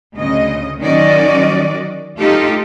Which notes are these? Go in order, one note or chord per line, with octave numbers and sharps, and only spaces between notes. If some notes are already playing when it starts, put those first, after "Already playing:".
D2 C#3 D#5
D#3 F#3 C#4 F#4 D5 D#5
A3 D#4 F4 G4 A4